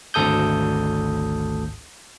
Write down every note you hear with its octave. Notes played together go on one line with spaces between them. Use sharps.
G#1 D2 A4 D#6 G6